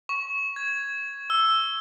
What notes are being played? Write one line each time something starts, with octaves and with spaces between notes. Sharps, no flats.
C#6
G#6
E6